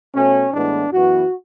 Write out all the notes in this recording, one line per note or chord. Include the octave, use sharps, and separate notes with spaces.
B2 A3 C#4
A2 E3 G#3 B3 D4
F#2 E3 B3 F#4